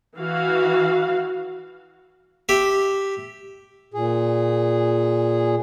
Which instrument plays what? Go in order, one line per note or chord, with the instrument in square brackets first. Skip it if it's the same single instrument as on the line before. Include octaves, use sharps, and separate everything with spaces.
[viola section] E3 F#4 F5
[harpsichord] G4 E5
[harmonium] A#2 G#4